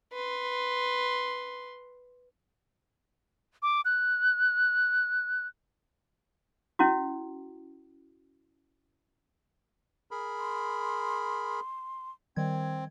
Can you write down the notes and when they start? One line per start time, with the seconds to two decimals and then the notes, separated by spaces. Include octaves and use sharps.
0.13 B4 C6
3.62 D6
3.85 F#6
6.79 C#4 E4 F#4
10.11 G#4 A#4 B5
10.38 C6
12.36 D#3 G3 C4 G#6